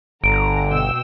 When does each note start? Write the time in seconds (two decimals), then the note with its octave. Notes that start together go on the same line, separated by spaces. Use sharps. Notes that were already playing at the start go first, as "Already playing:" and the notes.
0.24 G1 D3 A#5 D7
0.70 B2 G5 E6